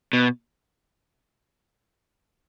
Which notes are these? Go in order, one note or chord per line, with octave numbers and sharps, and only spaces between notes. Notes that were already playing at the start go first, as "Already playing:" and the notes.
B2